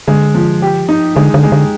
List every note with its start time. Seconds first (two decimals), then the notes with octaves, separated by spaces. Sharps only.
0.07 D3 G#3
0.34 F3
0.62 G4
0.88 D#4
1.16 D3 G#3
1.34 D3
1.43 G#3
1.52 D3